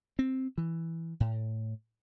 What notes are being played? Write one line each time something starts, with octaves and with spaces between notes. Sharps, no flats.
C4
E3
A2